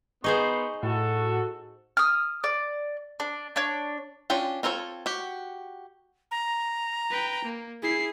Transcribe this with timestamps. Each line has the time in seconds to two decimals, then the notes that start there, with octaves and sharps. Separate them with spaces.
0.24 B3 D#4 G#4 C5 C6 C#6
0.83 A2 F#4 A4
1.97 D#6 F6
2.44 D5
3.20 D4
3.56 D4 C#5
4.30 C#4 D4 F4 G5
4.63 C4 F4 A4 C5 C#5
5.06 F#4 G4
6.31 A#5
7.10 B4 G5
7.44 A#3
7.82 E4 G#4 C7